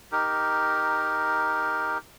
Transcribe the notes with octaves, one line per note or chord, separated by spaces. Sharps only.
D#4 G4 A#4